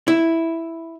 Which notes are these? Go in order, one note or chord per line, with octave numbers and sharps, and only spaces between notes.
E4